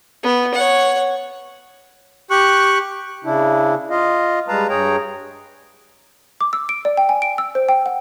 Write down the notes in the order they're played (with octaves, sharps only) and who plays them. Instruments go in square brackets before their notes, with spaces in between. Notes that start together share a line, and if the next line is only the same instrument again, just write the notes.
[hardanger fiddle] B3
C#5 F#5
[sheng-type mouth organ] G4 C#6 F#6
[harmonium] C#3 D4 E4
F4 D#5 F5
G3 G#3 B4 F5 A5 A#5
G2 G#4 C#5 G5 A#5
[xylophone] D6
E6
D7
D5
G5
G#5
D7
E6
C5
G5
F#5